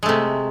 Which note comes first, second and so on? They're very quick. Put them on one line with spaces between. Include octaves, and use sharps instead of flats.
G#3 A3 C3